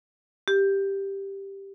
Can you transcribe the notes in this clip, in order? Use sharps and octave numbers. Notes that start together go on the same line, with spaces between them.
G4